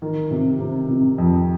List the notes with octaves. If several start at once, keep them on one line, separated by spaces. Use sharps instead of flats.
D#3
C3
C3
C3
F2